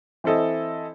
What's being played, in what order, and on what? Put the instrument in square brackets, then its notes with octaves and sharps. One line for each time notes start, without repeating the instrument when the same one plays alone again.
[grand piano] E3 C4 E4 A4 D#5